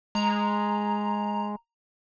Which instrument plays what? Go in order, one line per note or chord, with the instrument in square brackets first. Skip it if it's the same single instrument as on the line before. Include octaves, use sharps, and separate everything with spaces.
[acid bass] G#3 [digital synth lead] A#5